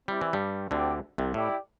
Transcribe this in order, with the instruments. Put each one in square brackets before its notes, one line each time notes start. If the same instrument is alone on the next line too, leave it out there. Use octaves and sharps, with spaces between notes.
[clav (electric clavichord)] G3 [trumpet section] C4 E4 G4 D5
[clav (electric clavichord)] E3
G2 G3
[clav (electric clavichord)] D2 D3 [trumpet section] C4 G4 D5 G5
[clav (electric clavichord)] C2 C3
[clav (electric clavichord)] A2 [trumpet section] E4 G4 D5 G5